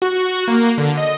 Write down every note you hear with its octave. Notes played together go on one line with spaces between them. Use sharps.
F#4
A#3
D3
D#5